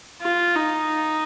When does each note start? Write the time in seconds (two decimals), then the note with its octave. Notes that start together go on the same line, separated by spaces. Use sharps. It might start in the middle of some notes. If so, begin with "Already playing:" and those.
0.22 F4
0.55 D#4